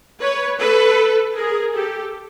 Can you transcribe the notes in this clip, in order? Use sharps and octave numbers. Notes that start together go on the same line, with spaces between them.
B4 C#5
A4 B4
G#4 A#4
G4 A4